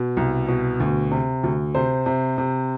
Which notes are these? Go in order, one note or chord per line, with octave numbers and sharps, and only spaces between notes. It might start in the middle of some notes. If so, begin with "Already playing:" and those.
Already playing: B2
C2
B2
D2
C3
D2
C3 C5
C3
C3